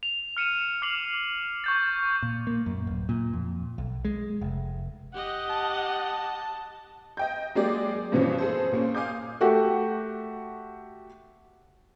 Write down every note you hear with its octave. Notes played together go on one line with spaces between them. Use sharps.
F7
F6 C#7 D#7 E7
D6 F6 C7 F7 F#7
C#6 G6 A6
A#2
A#3
F#2
D1
A#2
F2
B1
G#3
F1
G4 D#5 F#5
A5
D#5 G5 G6
F#3 G#3 A#3 G4 G#4 D5
G2 B2 E3 F3 C4 C#4
G#4 A4 C5
A#2 A#3 C#4
F5 G#5 D6 D#6 G6
A3 F#4 G4